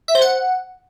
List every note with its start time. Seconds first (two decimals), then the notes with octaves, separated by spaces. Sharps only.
0.08 E5
0.15 C5
0.22 F#5